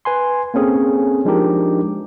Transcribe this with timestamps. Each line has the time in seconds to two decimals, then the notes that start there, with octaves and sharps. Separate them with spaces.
0.05 B4 G#5 C6
0.54 A#3 C4 C#4 G#4 A4
1.25 F3 G#3 D4 D#4 G4 A#4